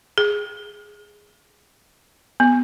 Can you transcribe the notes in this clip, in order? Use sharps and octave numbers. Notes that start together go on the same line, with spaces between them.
G#4
B3